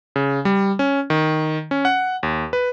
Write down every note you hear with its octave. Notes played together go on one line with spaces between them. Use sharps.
C#3
G3
C#4
D#3
C#4
F#5
D#2
B4